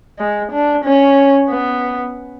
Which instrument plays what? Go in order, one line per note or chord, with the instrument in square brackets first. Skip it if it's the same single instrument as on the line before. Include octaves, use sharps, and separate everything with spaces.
[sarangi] G#3
D4
C#4
B3